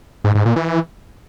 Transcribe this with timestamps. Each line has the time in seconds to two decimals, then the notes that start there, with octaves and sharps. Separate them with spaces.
0.24 G#2
0.35 G#2
0.46 A#2
0.56 E3